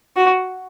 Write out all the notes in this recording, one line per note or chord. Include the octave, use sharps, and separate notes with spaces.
F#4